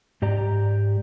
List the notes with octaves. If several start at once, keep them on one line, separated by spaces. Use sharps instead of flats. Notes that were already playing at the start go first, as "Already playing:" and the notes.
G#2 G4 D5 A#5